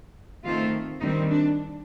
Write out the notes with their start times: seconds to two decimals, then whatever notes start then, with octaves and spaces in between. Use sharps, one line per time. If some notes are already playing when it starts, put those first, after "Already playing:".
0.44 D#3 A3 C4 F4
1.01 D#3 G3 C4 D#4
1.30 D4